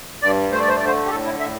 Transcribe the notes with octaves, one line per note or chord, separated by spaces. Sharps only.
G2 D5
A3 C5
D5
C5
D5
D3 C5
G4
A2 A4
E4
A2 E5